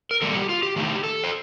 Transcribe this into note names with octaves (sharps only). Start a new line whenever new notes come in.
A#4
D#3 G3 A#3 A4
G4
F4
G4
D#3 A3 D#4 G4
A4
C5